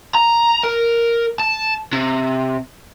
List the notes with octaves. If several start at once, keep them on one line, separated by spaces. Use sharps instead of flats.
A#5
A#4
A5
C3